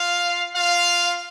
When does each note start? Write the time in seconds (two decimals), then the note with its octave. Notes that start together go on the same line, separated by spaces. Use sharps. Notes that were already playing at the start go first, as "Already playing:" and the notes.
Already playing: F4 F5
0.55 F4 F5